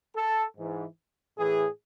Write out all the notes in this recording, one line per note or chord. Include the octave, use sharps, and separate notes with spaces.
A4
G#2 E3
A2 E3 G#4